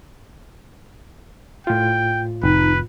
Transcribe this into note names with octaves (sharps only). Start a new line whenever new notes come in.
A2 F4 G5
F1 D#4 B4